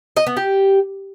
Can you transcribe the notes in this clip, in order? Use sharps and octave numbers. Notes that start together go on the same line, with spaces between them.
D#5
B3
G4